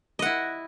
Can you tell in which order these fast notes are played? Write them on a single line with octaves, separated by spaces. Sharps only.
D#5 F#5 E4